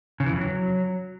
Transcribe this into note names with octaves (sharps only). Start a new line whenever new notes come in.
C#3
E3
F2
F#3